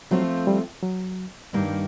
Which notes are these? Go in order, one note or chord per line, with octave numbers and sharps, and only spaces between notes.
F3 F#3 A3 C4 F4
G3
F#3
G2 D#3 G3 A#3 D#4